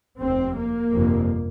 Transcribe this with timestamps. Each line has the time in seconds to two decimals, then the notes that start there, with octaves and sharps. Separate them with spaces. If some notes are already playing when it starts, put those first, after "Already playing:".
0.18 F1 D#2 C4
0.56 A#3
0.92 G1 F2 C3